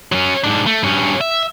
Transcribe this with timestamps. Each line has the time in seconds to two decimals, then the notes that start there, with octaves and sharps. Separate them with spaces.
0.12 F#3 C#4
0.44 G#2 D4
0.67 A3
0.83 G2 C#4
1.21 E5